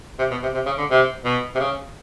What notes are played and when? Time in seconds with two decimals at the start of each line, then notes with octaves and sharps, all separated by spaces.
0.19 C3
0.31 B2
0.43 C3
0.54 C3
0.66 C#3
0.78 D3
0.90 C3
1.24 B2
1.55 C3
1.59 C#3